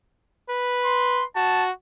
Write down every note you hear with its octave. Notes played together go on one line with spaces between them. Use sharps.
B4
C6
F#4 A5